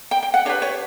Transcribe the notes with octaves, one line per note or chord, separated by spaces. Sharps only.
G5
G5
F#5
D4 G4 B4 C#5
C#5